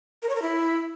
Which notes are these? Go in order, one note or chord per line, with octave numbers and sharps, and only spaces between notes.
A#4
C#5
A#4
E4